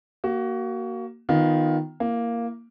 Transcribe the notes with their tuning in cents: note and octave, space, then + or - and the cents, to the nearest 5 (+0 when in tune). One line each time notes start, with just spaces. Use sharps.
A#3 +0 F#4 +25
D#3 +0 B3 +0 F4 +15
A#3 +0 E4 +30